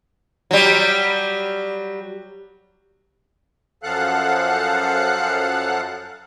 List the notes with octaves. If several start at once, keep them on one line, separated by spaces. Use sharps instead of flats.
F#3 G3
F#2 F3 A4 F5 F#5 F#6